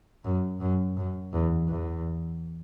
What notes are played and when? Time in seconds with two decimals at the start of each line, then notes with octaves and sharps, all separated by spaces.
0.25 F#2
0.60 F#2
0.97 F#2
1.33 E2
1.68 E2